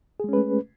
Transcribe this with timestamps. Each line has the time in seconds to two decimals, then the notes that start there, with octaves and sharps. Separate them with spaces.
0.20 G#4
0.24 G#3
0.29 C#4
0.33 B4
0.38 A3